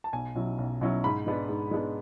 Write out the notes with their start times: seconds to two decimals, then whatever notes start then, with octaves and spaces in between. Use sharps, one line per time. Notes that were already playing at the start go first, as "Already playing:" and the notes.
0.04 A5
0.13 B1 G#5
0.35 B2 F#3 C#4 E4
0.58 B1
0.81 B2 F#3 C#4 E4
1.04 G#2 B5
1.27 G#3 B3 D4
1.49 G#2
1.71 G#3 B3 D4